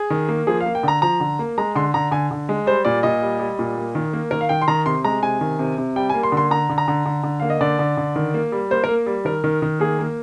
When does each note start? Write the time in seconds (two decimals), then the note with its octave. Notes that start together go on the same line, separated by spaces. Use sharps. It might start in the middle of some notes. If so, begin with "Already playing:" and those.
Already playing: G#4
0.10 D#3
0.29 A#3
0.47 F3 G#4
0.61 F5
0.66 A#3
0.75 G5
0.83 D3 A#5
1.02 F3 A#5
1.20 D3
1.39 A#3
1.58 G#3 A#5
1.75 D3 C6
1.94 D3 A#5
2.11 D3 G#5
2.31 D3
2.49 G#3
2.66 G3 C5
2.85 A#2 D5
3.03 A#2 D#5
3.22 G3
3.39 G3
3.59 A#2
3.77 A#3
3.95 D#3
4.13 A#3
4.31 D#3 A#4
4.41 F5
4.49 D#3 G5
4.62 C6
4.68 D#3 A#5
4.86 C3 C6
5.05 G#3 A#5
5.23 C3 G#5
5.41 D#3
5.59 C3
5.78 C3
5.96 G3 G5
6.10 G#5
6.14 A#3
6.23 C6
6.32 D3
6.37 C6
6.51 D3 A#5
6.70 D3
6.78 A#5
6.88 D3
7.06 D3
7.24 D3
7.40 A#3 F5
7.50 D#5
7.61 D3 D5
7.79 D3
7.97 D3
8.16 D#3
8.34 A#3
8.52 G3
8.71 A#3 C5
8.84 A#4
8.89 A#3
9.06 G3
9.25 D#3 A#4
9.44 D#3
9.62 D#3
9.80 A#3 G#4
9.99 A#3